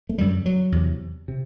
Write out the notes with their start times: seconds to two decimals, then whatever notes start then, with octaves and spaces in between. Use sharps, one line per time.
0.09 A3
0.18 F#2 D3 G3
0.46 F#3
0.72 E2 C3
1.28 C3